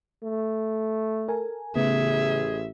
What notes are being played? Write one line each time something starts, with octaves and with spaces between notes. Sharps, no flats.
A3
A4 A#4 G#5
A1 C#3 A3 B3 G#4 E5